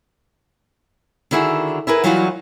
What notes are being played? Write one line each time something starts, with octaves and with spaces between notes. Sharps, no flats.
D3 D#3 E4 F#4 G#4
E4 G#4 A#4 B4
E3 F#3 G3 D#4 F4 F#4